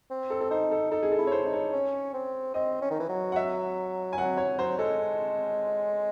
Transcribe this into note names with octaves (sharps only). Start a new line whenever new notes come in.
C4
A4
A4
D#4 C5
A4
D#4 A4
G#4
A4
E4
C#5
C5
D#4
C#5
C#4
C4
C4 D#5
C#4
D#3
E3
F#3
F#5
E5
G#5
F#3 F#5
C#5
F#3 C5
G#3 A4